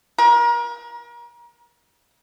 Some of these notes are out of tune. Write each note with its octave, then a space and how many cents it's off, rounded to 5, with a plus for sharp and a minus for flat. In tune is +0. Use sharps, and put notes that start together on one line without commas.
A#4 +35